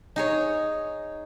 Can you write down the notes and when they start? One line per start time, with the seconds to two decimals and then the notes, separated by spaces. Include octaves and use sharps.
0.16 D#4 G#4 C#5